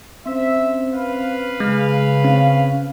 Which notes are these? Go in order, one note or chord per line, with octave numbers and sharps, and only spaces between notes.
C4 C#4 C5 E5
B4 F5
C#3 G#3 G#4
C4 C#4